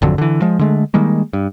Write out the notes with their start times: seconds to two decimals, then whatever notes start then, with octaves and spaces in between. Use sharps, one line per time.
0.02 G#1 F2 D3 F#3
0.18 D3 E3
0.42 F3 G#3
0.59 D3 G#3 A3
0.94 D#3 G3 G#3 A#3
1.33 G2